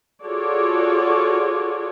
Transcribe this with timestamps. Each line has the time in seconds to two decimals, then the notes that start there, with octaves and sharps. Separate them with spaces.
0.24 F4 F#4 G#4 A4 C#5 D5